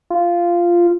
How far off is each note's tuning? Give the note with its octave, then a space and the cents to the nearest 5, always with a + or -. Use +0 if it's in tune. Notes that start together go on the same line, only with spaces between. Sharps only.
F4 -10